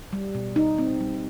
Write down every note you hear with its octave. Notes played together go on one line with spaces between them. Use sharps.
G3
B2
D#4
C4
G3